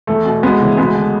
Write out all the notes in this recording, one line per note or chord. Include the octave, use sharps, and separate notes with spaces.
E2 A3
B2
D2 G#3 B3
C#3 E3
D2 G#3 B3
D3